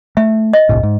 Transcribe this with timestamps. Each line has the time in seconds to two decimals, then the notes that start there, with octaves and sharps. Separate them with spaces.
0.17 A3 E5
0.53 D#5
0.69 G1 C2 A2
0.83 G#2